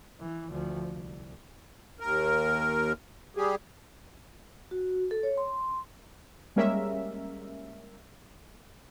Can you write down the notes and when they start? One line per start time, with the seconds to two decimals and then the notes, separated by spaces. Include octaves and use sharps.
0.19 E3
0.51 D2 F3
0.93 C2
2.00 D#2 A#4
3.37 G3 G4 G#4
4.71 F#4
5.11 A4
5.23 C#5
5.37 C6
6.56 G3 G#3 A#3 C#4 A#4 E5